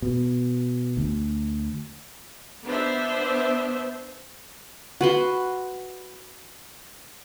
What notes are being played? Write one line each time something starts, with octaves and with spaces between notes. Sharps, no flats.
B2
D2
B3 D4 C5 E5
F#4 B4 C6